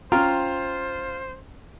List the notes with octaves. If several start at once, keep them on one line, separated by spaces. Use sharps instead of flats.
C#4 F4 C5 G5 A#5